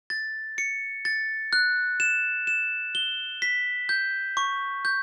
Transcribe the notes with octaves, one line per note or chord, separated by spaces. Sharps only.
A6
C#7
A6
F#6
E7
E7
G7
B6
G6
C#6
G6